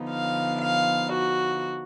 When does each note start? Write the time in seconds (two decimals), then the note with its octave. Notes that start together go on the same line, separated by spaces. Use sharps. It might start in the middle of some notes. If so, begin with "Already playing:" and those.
Already playing: D3 F3 B3 D#4
0.10 F5
0.60 F5
1.11 F#4